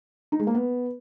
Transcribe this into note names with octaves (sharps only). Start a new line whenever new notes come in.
D#4
G#3
A#3
B3